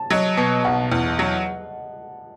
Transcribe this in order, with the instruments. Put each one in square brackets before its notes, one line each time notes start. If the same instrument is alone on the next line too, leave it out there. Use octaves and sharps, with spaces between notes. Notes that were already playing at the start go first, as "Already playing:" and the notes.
Already playing: [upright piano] A5
[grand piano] F#3 [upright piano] D#5
[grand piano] B2
[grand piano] B1 [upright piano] F#5
[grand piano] E2
F#3